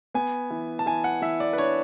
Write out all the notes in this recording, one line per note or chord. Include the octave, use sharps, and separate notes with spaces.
B3 G#5
E3
A5
E3 G#5
F#5
E3 E5
D5
B4
D4 C#5